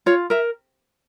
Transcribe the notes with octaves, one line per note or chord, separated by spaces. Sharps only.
F4 C#5
A#4 E5